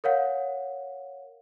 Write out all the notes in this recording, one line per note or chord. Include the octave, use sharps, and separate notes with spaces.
A#4 C#5 F5 F#5